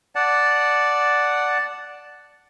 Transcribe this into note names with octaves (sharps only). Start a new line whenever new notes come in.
D5 F#5 A5